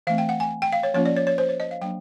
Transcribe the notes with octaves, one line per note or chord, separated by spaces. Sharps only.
E3 A3 C4 F5
G5
F#5
G#5
G5
F5
C#5
F3 A#3 C#4 F4 C#5
D5
C#5
C#5
C5
C#5
D#5
F5
F#3 A#3 D4 G5